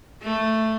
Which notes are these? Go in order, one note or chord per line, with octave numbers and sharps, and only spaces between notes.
A3